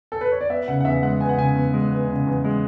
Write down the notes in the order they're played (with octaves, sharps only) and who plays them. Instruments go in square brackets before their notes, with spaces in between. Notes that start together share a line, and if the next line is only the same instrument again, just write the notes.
[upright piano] A4
B4
C#5
D5
B3 E5
C#3 F#5
F#5
E2 E5
G#3 F#5
B3 G#5
F#5
C#3 G#5
E2
G#3
B3
C#3
E2
G#3